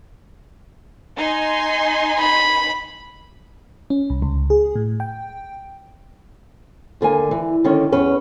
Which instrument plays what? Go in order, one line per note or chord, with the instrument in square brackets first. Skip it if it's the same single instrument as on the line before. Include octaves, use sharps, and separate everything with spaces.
[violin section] D#4 G#5 C6
[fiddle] B5
[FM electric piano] C#4
C2
C#2
G#4
A2
G5
[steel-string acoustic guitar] D#2 D3 A#3 G#5
E3
D3 D#3 C#4
E2 C#4 B4